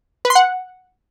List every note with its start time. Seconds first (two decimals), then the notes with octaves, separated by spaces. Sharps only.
0.25 B4
0.30 C6
0.35 F#5